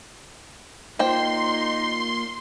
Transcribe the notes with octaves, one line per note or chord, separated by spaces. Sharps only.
A#3 D#4 F4 C5 G5 C6